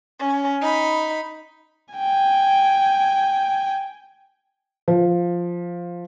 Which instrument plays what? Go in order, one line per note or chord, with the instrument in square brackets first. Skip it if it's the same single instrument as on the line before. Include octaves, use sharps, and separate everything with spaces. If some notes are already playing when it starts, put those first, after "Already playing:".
[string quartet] C#4
D#4 B5
[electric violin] G5 G#5
[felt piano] F3